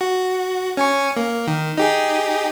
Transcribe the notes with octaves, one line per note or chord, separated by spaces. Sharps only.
F#4
C#4 G#5 C#6
A#3
D#3
D#4 G4 G#4